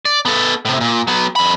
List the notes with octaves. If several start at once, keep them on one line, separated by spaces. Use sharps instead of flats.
D5
B3 A4
A2 C3
A#2
F#3 B3
F2 B5